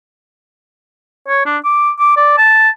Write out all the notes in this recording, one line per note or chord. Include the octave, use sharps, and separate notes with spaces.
C#5
D4
D6
D6
D5
A5